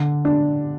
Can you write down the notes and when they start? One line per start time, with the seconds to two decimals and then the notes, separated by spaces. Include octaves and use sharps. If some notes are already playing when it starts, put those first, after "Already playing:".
Already playing: D3
0.25 D4